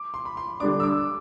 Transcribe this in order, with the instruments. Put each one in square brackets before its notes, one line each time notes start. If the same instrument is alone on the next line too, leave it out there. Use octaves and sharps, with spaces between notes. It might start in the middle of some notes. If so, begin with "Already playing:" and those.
Already playing: [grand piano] D6
C6
B5
C6
[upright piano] D3 G3 D4 [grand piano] D6
[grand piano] E6
D6